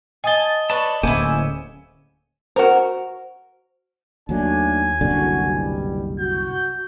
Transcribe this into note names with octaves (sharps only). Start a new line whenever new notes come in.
D#5 G#5 A5 D#6 G7
B4 C#5 D5 A5
D1 D3 A#3 C#4 E4 C5 G#5 D6
F#4 A#4 C5
D#2 F#3 A3 D4 G#5
F#1 C2 D3 F#4
B2 G3
F#4 G6